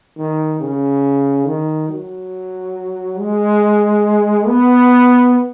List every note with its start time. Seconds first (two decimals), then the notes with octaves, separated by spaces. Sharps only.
0.17 D#3
0.60 C#3
1.46 D#3
1.89 F#3
3.19 G#3
4.48 B3